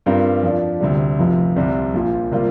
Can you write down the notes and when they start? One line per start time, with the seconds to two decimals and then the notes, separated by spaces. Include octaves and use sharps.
0.06 G2 G3 C4 F4 A#4
0.43 F2 F3 D4
0.81 D2 C3 G3
1.19 F1 F2 C3 F3
1.56 C2 C3 G3 C4
1.94 A#1 A#2 F3
2.32 C3 G3 A#3 F4